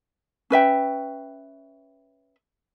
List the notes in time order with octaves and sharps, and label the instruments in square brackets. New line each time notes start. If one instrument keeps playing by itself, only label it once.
[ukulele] C#4 B4 E5 G5